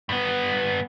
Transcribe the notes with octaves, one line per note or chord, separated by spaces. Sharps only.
G2 B3